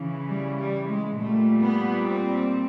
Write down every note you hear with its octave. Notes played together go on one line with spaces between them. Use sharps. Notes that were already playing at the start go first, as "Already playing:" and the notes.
Already playing: C#3 E3
G3
G3
G#3
A#2 G3 A3
B3
C4